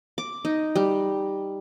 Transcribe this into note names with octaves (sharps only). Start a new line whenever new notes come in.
D6
D#4
G3